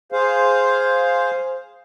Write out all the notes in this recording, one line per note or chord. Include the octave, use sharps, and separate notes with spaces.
G#4 C5 F5